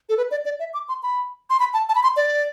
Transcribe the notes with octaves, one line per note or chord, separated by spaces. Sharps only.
A4
B4
D5
D5
E5
D6
C6
B5
C6
B5
A5
A5
B5
C6
D5